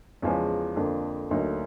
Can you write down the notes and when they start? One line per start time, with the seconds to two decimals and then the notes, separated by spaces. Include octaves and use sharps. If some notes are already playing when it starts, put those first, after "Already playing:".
0.22 E2 C#3 F3 G#3 C#4
0.76 F2 D3 F3 A#3 D4
1.31 D2 D3 F#3 A#3 D#4